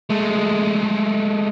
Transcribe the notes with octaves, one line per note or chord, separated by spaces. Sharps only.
G#3 A3